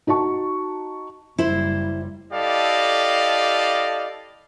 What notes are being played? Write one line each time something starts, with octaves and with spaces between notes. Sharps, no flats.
D#4 F#4 A5 C#6
F#1 G3 E4 C5
E4 G4 A4 D5 D#5 F5